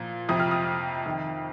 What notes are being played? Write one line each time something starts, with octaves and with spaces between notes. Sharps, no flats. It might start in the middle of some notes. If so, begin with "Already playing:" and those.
Already playing: A#2 F3
F2 C3 F3 D#6
F6
D#6
F2 D#3